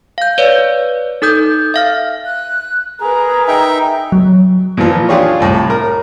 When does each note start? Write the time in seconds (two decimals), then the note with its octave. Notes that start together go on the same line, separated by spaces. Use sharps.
0.18 F5 G6
0.38 B4 C#5 D5
1.22 D#4 A4 D#6 G6
1.74 E5 F5 F6
2.25 F#6
3.00 G#4 A#4 B4 A#5
3.48 D#4 E5 G5
4.12 F#3
4.77 A#2 E3 F3
5.09 D4 F4 G4 G#4 C#5
5.40 C2 A2
5.70 A#4